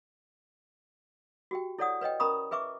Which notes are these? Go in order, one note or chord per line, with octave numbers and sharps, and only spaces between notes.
F#4 G4 G5
E4 A4 C#5 D5 F#5 D#6
B4 C#5 D#5 G5
C#4 A#4 A#5 B5 C#6 D#6
G#4 B4 E5 C#6 D6